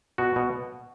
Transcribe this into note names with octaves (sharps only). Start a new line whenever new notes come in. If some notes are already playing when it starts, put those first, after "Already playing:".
B2 F#4
B2